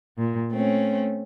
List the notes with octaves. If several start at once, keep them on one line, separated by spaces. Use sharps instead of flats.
A#2
A3 C4 C#4